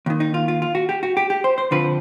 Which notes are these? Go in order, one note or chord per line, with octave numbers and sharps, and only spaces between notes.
D#2 D#3
D#4
F4
F4
F4
F#4
G4
F#4
G4
G4
C5
C5
F2 D3 F3 B4